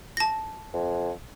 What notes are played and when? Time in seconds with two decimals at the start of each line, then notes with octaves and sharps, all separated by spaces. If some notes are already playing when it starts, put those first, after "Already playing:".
0.17 A5 A#6
0.73 F2